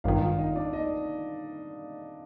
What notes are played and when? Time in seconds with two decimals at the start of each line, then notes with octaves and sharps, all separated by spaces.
0.04 G#1 G2 D#3 F4 F5
0.21 F4 F5
0.38 D#4 D#5
0.56 D4 D5
0.73 D#4 D#5